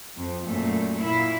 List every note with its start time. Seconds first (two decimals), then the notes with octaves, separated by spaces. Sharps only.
0.16 F2
0.46 F#2 A#2 A3
0.98 A#2 E4